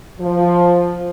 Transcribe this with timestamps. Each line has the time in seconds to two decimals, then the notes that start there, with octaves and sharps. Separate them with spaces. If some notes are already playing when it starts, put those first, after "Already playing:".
0.20 F3